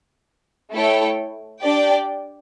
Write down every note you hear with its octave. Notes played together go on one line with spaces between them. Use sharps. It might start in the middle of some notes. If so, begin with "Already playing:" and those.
A3 E4 A4 C#5 G5
D4 G4 D5 G5